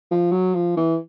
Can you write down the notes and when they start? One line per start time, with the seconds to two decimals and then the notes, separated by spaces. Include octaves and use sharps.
0.11 F3
0.32 F#3
0.55 F3
0.77 E3